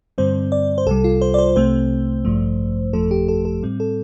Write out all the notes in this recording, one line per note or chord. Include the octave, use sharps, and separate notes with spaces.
G2 D3 G3 C4 C5
D5
C5
C2 C3 G3 A4
F4
C5
D5
C5
C2 C3 A3 C4 C5
A1 G2 F3 A3
G1 F2 F3 A3 A4
G4
A4
A4
A2 G3 C4
A4